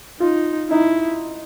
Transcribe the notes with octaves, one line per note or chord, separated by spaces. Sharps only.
D#4 F4
D#4 E4